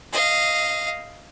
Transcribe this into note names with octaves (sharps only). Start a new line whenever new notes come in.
D#5 F5